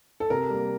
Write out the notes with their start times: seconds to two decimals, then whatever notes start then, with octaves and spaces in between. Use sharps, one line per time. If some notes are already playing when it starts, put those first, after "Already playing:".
0.20 A4
0.30 C3 A#4
0.50 G3 A#3